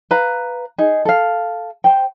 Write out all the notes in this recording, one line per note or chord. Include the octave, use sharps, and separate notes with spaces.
B4 F5 A#5
D#4 G#4
A4 F5
C5 G5